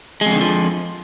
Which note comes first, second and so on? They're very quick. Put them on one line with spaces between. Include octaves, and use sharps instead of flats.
G#3 F2 D3 D#3 F3